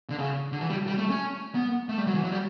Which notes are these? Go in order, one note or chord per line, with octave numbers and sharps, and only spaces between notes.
D3
C#3
D3
E3
G3
G3
A3
C#4
B3
A3
G3
F#3
E3
F#3
G3